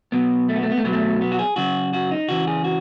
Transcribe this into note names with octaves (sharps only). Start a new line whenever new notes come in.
B2 F#3 B3
A3
B3
A3
B3
A3
B2 F#3 B3
A3
B3
F#4
G#4
C#3 F#3 F#4
F#4
D#4
C#3 E3 F#4
G#4
F#4